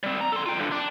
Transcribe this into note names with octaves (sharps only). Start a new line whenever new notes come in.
G3 C4
A#5
A4 C6
F4 G5
G2 D3
D4